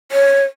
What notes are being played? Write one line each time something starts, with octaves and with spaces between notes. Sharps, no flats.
C#5